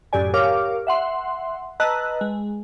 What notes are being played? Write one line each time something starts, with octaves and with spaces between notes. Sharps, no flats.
C#2 F#2 A2 G4 D5 G#5
G4 A#4 C#5 F5 D6 F6
E5 F#5 C6
B4 D#5 A5 A#5 E6 F#6
G#3